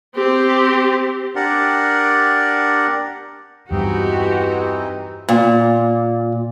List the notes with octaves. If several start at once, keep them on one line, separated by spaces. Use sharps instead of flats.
C4 G4
D4 G4 A#4 D5 F#5
E2 G2 E3 C4 D#4 F#4 G4
A#2